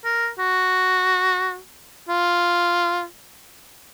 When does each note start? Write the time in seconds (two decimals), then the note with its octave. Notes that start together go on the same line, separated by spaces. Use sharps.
0.05 A#4
0.39 F#4
2.09 F4